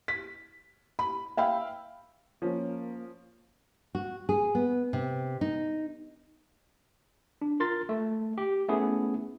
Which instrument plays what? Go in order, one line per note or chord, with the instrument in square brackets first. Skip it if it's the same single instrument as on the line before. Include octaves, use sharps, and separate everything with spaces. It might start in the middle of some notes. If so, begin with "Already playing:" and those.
[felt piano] B6
B5
E5 F5 G5 B5
[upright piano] F3 C#4 [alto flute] A#3
[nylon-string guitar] F#4
G#4
B3
C3
D#4
[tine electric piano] D4
F4 A#4 C6 A6
A3
G4
A3 B3 C#4 E4 G#4